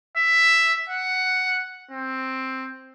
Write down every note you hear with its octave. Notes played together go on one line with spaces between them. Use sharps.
E5
F#5
C4